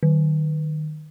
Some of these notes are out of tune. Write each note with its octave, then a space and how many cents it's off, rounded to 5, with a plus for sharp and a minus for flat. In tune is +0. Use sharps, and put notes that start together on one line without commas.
D#3 -25